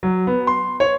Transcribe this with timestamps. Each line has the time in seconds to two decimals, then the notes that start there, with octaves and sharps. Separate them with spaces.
0.03 F#3
0.27 B3
0.47 C6
0.80 C#5